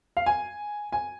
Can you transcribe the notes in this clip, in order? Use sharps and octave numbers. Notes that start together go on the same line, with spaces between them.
F5
G#5
G#5